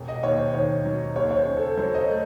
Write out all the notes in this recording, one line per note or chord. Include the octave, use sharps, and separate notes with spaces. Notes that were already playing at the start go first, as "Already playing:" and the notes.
Already playing: E1
D#5
D#2 C#5
C5
D#3 C#5
F#3
D#2 C#5
C#5
C5
C#3
A4
F#3 C5
D#5
C#5
A3